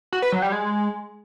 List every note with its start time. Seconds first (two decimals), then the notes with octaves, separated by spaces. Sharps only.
0.13 F#4
0.22 B4
0.32 F#3
0.42 G3
0.52 G#3